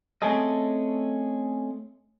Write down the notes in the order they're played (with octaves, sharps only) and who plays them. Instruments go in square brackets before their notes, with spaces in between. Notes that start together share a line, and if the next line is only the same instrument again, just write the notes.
[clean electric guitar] A3 C4 C#4 G#4 A4 D#5